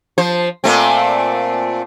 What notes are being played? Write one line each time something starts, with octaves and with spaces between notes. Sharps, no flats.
F3 C5
A#2 A3 C4